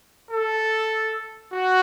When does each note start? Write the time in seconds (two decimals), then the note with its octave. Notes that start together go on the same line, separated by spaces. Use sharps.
0.32 A4
1.51 F#4